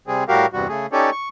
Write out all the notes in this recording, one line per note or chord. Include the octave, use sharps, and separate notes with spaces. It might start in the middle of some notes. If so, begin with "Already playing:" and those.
C3 G3 C4 G#4
A2 G3 F#4 G4 A#4 F5
E2 G2 C3 G3 F#4
C#3 A3 G#4
C#4 D#4 G4 A4 C#5 D5
C#6